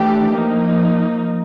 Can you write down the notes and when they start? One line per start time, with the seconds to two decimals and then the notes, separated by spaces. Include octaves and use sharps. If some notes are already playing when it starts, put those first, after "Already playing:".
Already playing: E3 A3 D4 G4
0.30 F3 A#3 D#4